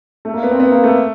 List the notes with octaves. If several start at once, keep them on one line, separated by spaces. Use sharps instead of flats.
A3
A#3
B3
C4
B3
A#3
A3